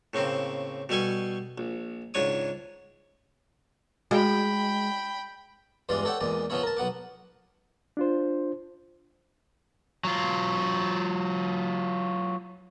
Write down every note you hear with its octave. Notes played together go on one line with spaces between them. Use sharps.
A2 C#3 A#3 C4
B2 G3 A4 G#5 C#6
A#1
C#2 G#2 D4 C#5 D#6
G#3 F#4 G#4 F5 G5 B5
E2 G2 E3 G#3 F4 D5
A4 C#5 D5 E5 F#5 G5
E2 A#2 G#3 D5
C#3 F3 B3 C#4 E4 C#5
A#4 A5
B1 B3 F#5 D6
D4 F4 C5
F#3 F4